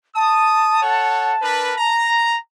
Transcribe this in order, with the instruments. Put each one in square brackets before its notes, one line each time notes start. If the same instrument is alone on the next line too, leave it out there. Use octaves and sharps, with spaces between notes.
[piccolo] A5 [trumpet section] D#6
[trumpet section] A4 C#5 F#5
D4 A#4 B4
A#5